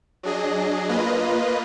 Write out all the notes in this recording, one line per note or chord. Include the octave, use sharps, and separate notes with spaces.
F#3 D4 G#4 D#5
A#3 F4 B4 D#5